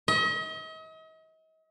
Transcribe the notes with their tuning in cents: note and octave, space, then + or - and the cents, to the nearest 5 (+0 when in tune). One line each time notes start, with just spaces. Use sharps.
D#5 +40